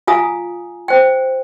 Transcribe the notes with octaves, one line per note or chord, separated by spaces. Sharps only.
F4 G#4 F5 G#5 A#5 D#6
C5 G5